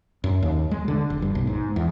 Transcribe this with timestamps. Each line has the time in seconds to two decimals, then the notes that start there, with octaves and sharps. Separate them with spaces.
0.24 F#2
0.42 D#2
0.71 G#3
0.88 D3
1.10 F1
1.22 G2
1.35 B1
1.47 G#2
1.76 E2